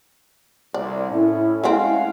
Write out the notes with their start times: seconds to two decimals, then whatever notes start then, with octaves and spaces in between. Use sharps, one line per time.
0.74 C2 D5
1.10 A2 C#4 E4
1.64 G#3 A3 C4 F5 F#5 G#5